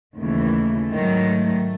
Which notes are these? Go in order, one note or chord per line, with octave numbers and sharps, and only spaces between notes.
D#2 C#3 E3 A3
G#2 D#3 F#3